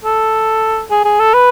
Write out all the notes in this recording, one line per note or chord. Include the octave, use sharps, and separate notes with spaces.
A4
G#4
G#4
A4
B4